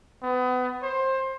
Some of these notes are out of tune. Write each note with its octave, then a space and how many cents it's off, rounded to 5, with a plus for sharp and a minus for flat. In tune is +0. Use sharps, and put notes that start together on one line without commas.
B3 +30
C5 +20